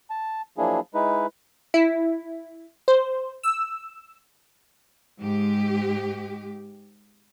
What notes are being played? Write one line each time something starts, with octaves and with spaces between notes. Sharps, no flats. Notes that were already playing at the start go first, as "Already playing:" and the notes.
A5
F3 F#3 A#3 D4 E4 G#4
G#3 D#4 E4 B4
E4
C5
E6
G#2 G#3 G4